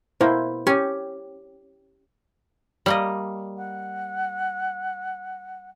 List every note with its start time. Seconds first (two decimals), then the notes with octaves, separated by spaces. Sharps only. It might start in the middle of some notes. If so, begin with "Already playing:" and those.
0.21 B2 A#3 E4 C5
0.67 C#4 G4
2.86 G3 A#3 D#5
3.57 F#5